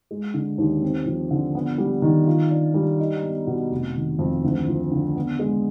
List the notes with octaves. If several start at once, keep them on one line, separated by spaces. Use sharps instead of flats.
G#3
D3
D#2
C4
F3
D3
B3
G3
D#3
F4
D4
G3
D#4
B3
B2
F1
D#3
F2
D2
F3
D3
B3
G#3